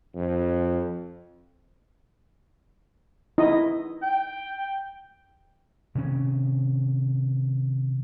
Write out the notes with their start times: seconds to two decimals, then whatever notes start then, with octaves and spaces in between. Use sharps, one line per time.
0.15 F2
3.38 D#4 E4 D#5
4.03 G5
5.95 C3 D#3 C4 C#4